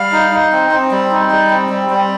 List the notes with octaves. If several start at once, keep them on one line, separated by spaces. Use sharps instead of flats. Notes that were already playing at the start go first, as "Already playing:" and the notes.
Already playing: G3 F5
D#4
D#4
C4
C4
G3
D#4
G3
C4
G3
G3